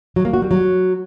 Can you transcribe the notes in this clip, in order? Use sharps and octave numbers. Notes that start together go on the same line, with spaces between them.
F#3
A#3
F#4
G3
F#3